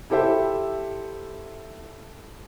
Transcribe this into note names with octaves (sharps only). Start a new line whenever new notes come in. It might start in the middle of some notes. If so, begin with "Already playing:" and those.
E4 G4 A4 C5 E5